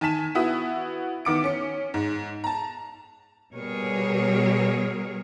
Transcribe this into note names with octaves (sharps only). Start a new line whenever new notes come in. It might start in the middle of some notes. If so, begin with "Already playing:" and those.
D#3 G#5 A5 B6 E7
B3 E4 F#4 E5 D#6 B6
D#3 B3 D6 C#7 D7
C#4 C#7
G#2
A5 A#5
B2 G3 G#4 A#4 C#5